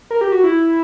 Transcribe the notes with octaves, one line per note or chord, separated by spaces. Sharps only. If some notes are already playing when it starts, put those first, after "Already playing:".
A#4
G4
F#4
E4